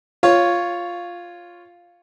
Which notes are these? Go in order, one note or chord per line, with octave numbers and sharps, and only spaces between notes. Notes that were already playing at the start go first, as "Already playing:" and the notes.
F4 C#5